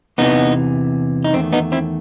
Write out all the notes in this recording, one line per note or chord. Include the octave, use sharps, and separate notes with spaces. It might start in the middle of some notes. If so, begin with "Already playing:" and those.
E2 C3 E3 B3 D#4
D#4
E2 D#3 A3 C4
B3 D#4
C4 E4